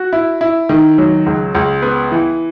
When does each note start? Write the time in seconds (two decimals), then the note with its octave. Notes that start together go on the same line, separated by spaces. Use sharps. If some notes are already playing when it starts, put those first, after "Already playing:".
Already playing: F#4
0.13 E4
0.41 E4
0.69 D#3
0.98 F#3
1.26 C#2
1.55 C#2
1.82 B3
2.12 E3